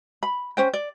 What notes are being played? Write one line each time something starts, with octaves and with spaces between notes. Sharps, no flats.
B5
C#4 C5 G5
D5